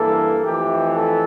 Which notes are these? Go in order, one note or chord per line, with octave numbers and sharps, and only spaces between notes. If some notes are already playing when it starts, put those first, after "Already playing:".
Already playing: G2 E3 A#3 A4
F2 E3 A3 G4
A4